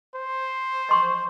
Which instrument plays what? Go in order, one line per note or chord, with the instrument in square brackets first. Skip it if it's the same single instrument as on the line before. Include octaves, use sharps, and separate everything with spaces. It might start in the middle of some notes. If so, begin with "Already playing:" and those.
[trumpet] C5
[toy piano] D#5 C6 C#6